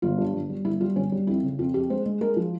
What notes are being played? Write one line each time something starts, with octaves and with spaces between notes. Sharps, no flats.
G1 F4
G2
G1
G3
G1 E4
G3 F4
G1 C#4
G3
F2 E4
C#3
F2 F4
F2 G4
G#3 C5
G#3
G#3 A#4
F3